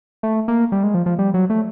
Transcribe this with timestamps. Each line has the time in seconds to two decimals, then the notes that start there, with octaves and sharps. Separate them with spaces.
0.23 A3
0.48 A#3
0.72 G3
0.83 G#3
0.94 F3
1.06 F3
1.19 G3
1.34 F#3
1.50 A3